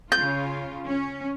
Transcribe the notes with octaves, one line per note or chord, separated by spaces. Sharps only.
C#3 F4 G6
C#4